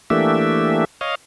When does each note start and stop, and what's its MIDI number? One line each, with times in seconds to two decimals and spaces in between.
0.10 0.85 52
0.10 0.85 57
0.10 0.85 58
0.10 0.85 62
0.10 0.85 67
0.10 0.85 76
1.01 1.15 73
1.01 1.15 75
1.01 1.15 77